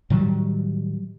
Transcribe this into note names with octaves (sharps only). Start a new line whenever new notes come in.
A2 D#3 F#3 G3